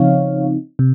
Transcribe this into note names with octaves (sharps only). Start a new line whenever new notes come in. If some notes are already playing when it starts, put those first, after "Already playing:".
Already playing: C#3 F3 C4 D#4 C#5 F5
C3